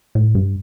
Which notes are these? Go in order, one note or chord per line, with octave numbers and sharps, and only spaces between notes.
A2
G2